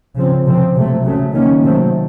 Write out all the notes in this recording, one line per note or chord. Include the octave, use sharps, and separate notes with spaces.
C#3 F3 C4
C3 F3 C4
C3 F#3 A3
C#3 F#3 A3
D#3 A#3 C#4
C3 D#3 F#3 A3 C4